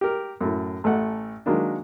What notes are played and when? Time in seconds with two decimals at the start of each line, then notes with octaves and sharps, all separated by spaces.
0.01 G4 A#4
0.41 F#2 A2
0.84 A1 A3 F#5
1.46 D#3 F#3 G#3 A#3 D4